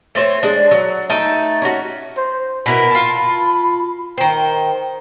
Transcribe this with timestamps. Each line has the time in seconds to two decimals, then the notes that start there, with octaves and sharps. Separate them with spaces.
0.15 A3 C4 C5 C#5
0.43 G#3 D4
0.71 F#3
1.10 A3 D#4 G5 A5
1.62 C#4 F#4
2.17 C5
2.66 B2 E4 A#4 B5
2.91 F4 A5
4.18 D#3 C5 G5